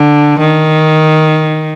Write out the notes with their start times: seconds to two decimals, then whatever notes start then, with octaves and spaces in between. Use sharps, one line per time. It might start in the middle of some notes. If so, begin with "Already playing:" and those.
Already playing: D3
0.39 D#3